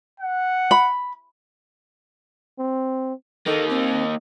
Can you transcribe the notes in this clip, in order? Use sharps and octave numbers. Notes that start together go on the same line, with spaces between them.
F#5
B5
C4
A#3 D#4 A4
C4